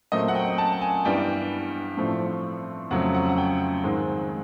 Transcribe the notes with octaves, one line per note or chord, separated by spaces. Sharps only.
A#2 F#3 A3 C4 D#5
F#5
G5
A5
G#5
G2 E3 G3 B3 G5
A2 F3 A3 C4
F2 C#3 F#3 A3 C4 F#5
F#5
F#5
G5
G#2 D#3 G#3 C4